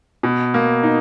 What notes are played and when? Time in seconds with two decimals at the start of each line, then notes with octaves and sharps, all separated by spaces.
0.23 B2
0.54 A#3
0.83 D#4